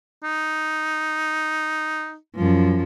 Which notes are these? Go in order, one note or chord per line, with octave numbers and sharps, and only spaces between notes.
D#4
F#2 F3